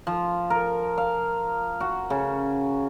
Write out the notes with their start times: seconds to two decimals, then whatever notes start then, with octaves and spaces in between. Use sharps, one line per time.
0.07 F3
0.50 A#4
0.98 F5
1.80 F#4
2.10 C#3